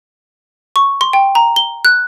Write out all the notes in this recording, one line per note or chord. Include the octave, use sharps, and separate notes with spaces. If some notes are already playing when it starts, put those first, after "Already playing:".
C#6
C6
G5
A#5
G7
F#6